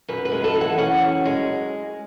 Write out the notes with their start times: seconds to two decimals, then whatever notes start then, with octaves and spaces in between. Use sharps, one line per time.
0.08 F#2 B4
0.25 B4
0.32 G#3
0.44 A4
0.55 E3
0.61 F#5
0.78 C#4 F#5
1.02 F#2
1.25 G#3